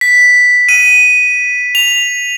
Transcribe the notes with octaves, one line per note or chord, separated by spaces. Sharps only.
B6
D#7
F7